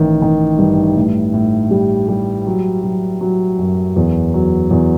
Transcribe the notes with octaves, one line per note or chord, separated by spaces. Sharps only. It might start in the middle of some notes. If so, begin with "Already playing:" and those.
Already playing: A1 D#3
D#3
G2
A2
A2
G3
G3
F#3
F#3
F#3
F#2
E2
F#3
E2